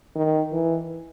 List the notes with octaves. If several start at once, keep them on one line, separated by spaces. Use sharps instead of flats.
D#3
E3